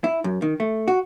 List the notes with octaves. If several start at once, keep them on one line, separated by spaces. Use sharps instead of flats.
E4
F#2
D#3
A3
F#4